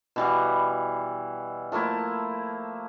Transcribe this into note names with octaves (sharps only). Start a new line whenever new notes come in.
B2 E3 G3
F3 A3 A#3 E4